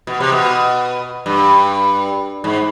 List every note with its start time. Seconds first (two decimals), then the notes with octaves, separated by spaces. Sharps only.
0.07 B2
0.20 C3
0.32 B2
1.26 G2
2.44 G#2